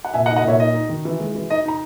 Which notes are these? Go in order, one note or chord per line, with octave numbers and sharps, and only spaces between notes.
F#5
A#2 E5 G#5
D#5 F#5
D#4
D#5 F#5
A#2 C#5 E5
D#4 D#5
D#4
D#3
E3
G#3
E3
D#4 D#5
D#4 A#5